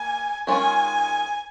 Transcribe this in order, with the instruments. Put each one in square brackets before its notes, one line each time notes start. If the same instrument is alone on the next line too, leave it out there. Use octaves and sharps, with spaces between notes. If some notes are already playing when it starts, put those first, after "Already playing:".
Already playing: [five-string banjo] A#3 [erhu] G#5
[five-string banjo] D#3 G#3 C#4 F4 [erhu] G#5